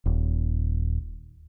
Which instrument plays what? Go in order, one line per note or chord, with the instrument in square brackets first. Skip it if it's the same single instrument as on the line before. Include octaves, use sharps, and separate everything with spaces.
[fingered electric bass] D#1